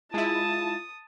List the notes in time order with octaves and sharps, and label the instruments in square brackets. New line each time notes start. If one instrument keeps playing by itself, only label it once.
[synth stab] G#3 E4 [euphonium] F4 [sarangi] A5 [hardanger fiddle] D#6